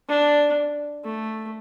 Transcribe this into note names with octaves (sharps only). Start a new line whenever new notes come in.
D4
A3